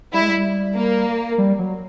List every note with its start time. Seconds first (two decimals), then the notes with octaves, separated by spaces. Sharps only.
0.13 G3 E4
0.21 G#3
0.29 G3
0.75 A#3
1.38 G3
1.59 F#3